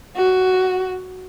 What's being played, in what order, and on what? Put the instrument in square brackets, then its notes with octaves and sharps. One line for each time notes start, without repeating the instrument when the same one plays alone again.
[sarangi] F#4